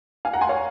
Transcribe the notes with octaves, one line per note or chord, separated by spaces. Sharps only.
F5 G#5
F#5 A#5
G#5 C6
C#5 F5